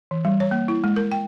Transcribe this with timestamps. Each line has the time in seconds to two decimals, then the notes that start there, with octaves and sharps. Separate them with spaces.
0.11 E3
0.25 G3
0.40 C#5
0.51 A#3
0.68 E4
0.84 G#3
0.96 A#4
1.12 G5